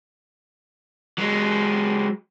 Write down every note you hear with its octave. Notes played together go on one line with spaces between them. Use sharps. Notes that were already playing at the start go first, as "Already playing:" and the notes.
F#3 G#3